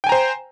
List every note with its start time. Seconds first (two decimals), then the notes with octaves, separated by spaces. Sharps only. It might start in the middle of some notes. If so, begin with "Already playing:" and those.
0.04 G5
0.07 G#5
0.09 A#5
0.12 C5